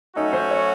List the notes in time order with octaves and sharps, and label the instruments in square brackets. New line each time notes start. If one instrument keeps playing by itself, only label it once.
[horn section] F#3 A3 C#4 F#4 [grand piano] D#4
[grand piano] C5
C#5